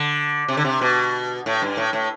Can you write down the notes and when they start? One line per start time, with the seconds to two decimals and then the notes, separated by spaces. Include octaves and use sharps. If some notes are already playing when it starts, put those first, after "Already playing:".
Already playing: D3
0.48 C3
0.57 D3
0.65 C3
0.81 B2
1.46 A2
1.62 G2
1.77 A2
1.93 A2